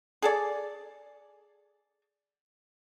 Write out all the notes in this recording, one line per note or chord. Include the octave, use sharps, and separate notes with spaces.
G#4 A4 D5